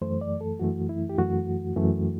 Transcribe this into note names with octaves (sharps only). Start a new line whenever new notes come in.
F#2 E3 A3 C5
D5
A4
F#2 E3 A3 F#4
E4
G4
F#2 E3 A3 F#4
F#2 E3 A3